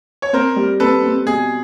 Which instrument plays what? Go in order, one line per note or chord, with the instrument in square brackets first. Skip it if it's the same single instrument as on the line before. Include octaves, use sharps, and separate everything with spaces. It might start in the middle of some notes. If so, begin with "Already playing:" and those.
[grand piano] C#5
[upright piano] C4 [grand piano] A#4 C5
[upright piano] G3
[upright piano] C4 [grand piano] A4 B4
[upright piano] C4
[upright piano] B2 [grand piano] G#4